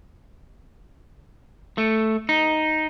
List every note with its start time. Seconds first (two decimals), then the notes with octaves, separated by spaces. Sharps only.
1.78 A3
2.29 D#4